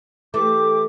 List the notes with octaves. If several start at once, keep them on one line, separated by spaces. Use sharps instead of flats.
E3 A3 G4 D6